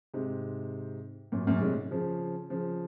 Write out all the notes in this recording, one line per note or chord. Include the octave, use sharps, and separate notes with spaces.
G#2 C3
F#2 A#2
F#2 A#2
G#2 C3
C#3 F3
C#3 F3